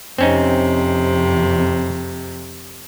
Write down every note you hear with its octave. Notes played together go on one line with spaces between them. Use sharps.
F2 C3 C4 C#4 D#4